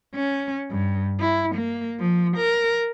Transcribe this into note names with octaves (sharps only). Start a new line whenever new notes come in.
C#4
G2
E4
A#3
F3
A#4